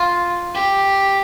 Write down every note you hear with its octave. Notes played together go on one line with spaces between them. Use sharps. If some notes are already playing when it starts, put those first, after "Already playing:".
Already playing: F4
G4